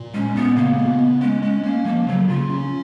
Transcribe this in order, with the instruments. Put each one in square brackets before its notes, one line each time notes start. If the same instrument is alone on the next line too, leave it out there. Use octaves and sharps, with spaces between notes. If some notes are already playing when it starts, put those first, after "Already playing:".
Already playing: [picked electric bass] A#2
[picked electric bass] G#3 [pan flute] C#4
[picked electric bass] A#2 [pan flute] B3
[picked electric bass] C#3 [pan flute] A#3
[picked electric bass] B3
B3
[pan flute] G#3 [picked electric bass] C#4
[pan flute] G#3 [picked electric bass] C#4
[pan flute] A#3 [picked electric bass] C#4
[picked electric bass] F3 [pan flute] A#3
[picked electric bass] C#3 [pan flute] F#3
[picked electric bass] C#3 [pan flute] F4
[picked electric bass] C#4